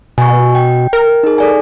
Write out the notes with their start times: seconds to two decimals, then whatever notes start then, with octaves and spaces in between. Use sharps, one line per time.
0.18 B2 G#5 C#6
0.55 G5
0.93 A#4
1.23 D#4 G#4
1.38 A4 D5 G#5